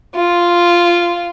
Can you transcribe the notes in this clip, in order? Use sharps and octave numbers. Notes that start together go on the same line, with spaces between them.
F4